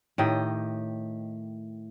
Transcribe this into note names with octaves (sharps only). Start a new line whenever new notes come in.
A2 D#3 G4 D#5